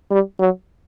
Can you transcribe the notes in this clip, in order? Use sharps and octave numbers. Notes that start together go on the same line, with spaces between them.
G3
F#3